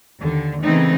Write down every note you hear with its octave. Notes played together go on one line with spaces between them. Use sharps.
D#2 D3
C#3 E3 A3 B3 C4 D#4